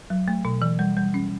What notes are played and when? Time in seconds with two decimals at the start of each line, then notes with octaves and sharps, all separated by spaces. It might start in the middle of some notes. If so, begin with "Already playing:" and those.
0.10 F#3
0.28 A3
0.45 B2
0.62 E3
0.79 G3
0.97 G3
1.14 C#4